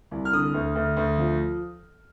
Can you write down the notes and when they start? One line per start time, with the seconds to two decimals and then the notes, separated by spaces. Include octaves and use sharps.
0.11 C2
0.25 F6
0.33 D3 D#6
0.54 D2
0.75 D2
0.97 D2
1.18 F3